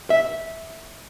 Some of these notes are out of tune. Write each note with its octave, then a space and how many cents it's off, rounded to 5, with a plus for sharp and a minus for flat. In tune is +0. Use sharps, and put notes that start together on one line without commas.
E5 -10